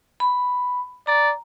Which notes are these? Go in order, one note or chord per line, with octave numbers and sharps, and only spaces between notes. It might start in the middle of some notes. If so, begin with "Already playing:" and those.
B5
D5 A#5